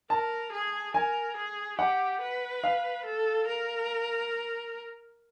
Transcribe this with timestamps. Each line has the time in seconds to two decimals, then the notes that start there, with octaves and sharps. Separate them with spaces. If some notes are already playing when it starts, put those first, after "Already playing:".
0.10 A#4 A5
0.52 G#4
0.94 A#4 G#5
1.37 G#4
1.79 G4 F#5
2.21 B4
2.64 F5
3.05 A4
3.47 A#4